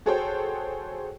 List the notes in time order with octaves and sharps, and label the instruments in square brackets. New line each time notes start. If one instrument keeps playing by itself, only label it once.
[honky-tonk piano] F#4 G#4 A4 C5 C#5 G5